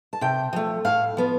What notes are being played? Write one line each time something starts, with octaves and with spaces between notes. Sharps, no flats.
A5
C3 G5
F3 A3
A2 F5
F3 B3